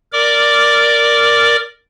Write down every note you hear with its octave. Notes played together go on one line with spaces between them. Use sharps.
A#4 D5 D6